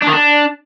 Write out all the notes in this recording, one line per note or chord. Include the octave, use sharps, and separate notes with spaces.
D4
D#3
D4